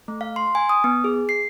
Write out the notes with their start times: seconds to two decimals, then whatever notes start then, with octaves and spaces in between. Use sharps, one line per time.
0.08 A3
0.21 F5
0.36 C6
0.55 G#5
0.69 D#6
0.84 B3
1.04 G#4
1.29 C7